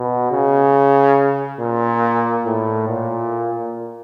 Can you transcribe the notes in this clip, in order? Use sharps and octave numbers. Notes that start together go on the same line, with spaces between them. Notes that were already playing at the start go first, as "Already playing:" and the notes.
Already playing: B2
C#3
A#2
A2
A#2